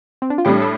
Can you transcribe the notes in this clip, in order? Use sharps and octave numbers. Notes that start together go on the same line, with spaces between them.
C4
D4
F4
A2 G3 D4 G4
A4